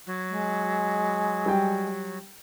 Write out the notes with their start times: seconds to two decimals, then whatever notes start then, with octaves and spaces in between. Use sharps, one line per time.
0.06 F#3
0.29 G#3
1.46 G3 G5